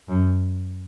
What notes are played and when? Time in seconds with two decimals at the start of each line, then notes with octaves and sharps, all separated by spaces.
0.09 F#2